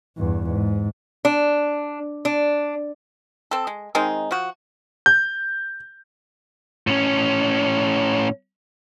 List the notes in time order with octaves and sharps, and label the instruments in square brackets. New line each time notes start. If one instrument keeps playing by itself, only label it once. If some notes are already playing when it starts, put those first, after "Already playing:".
[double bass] E2 G2
G#2
[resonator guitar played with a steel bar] D4
D4
[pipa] C4 A4
G#3
D#3 G#3 C4 D#4
F3 F#4
[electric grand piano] G6
[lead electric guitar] A2 C#4